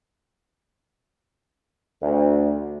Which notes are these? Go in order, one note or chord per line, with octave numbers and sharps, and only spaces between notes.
D2